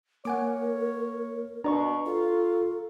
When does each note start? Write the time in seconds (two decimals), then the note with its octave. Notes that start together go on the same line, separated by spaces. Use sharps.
0.25 A#3 A#4 C#5 F#5 G#5 D6
1.64 B2 D4 D5 A#5 C#6
2.06 F4 A4